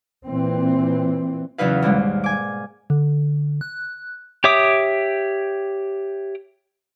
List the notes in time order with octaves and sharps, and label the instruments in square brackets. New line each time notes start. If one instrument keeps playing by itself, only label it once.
[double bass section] A#2 E3 C4
[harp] E2 C#3 F#3 D#4 B4 F5
D#2 G#2 B2 G3 A#3
G#5 D6
[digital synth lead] D3
F#6
[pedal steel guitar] G4 C#5 E5 D6 D#6